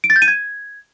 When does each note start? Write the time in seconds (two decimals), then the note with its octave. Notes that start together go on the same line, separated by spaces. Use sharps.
0.04 D7
0.10 A6
0.16 G6
0.22 D#7
0.28 G#6